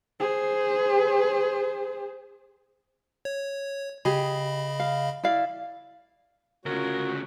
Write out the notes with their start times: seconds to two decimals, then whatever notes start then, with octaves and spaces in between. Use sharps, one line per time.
0.20 G#4 C5
3.25 C#5
4.05 C#3 G4 G#4 D#5 B5
4.80 F5
5.23 E4 D5 F5
6.66 D2 C#3 C#4 F4 F#4 A#4